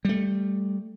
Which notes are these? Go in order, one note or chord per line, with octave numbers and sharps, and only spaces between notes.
G3 A3